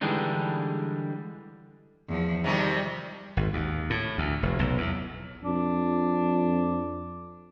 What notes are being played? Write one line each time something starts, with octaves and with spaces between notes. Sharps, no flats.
D3 E3 G3 G#3 D4 D#4
E2 F3
C3 D#3 F3 G3
G#1
D#2
A2
D2
F1
B1
E2
F2 D4